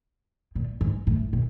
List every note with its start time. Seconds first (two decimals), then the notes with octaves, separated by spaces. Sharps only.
0.55 A#2
0.81 G#2
1.07 A2
1.33 A#2